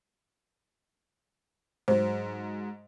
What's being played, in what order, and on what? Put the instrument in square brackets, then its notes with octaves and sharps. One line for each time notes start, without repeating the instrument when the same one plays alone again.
[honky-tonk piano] G#2 F#3 [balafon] C5